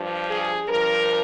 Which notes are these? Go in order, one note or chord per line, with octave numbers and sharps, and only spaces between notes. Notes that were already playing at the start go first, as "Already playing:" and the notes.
Already playing: G2 F3
G#4
G2 F3 A#4